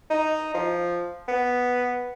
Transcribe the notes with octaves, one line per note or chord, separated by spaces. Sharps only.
D#4
F3
B3